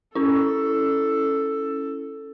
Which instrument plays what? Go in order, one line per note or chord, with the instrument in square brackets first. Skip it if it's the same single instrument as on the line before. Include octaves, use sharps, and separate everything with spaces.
[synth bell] C#4 E4 [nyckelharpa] A4